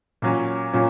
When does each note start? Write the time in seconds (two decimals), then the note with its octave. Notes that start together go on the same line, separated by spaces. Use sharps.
0.22 A#2 F#3 C#4
0.73 A#2 F#3 C#4